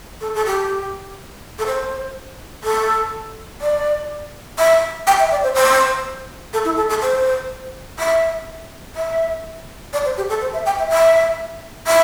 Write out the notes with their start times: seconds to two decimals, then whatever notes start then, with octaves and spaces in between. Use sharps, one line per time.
0.21 A4
0.35 A4
0.46 G4
1.59 A4
1.67 C5
2.64 A4
3.61 D5
4.59 E5
5.07 G5
5.20 E5
5.31 D5
5.43 C5
5.55 C5
6.53 A4
6.65 E4
6.77 A4
6.89 A4
7.02 C5
7.99 E5
8.96 E5
9.93 D5
10.05 C5
10.17 G4
10.30 A4
10.41 C5
10.53 E5
10.66 G5
10.78 E5
10.90 E5
11.87 E5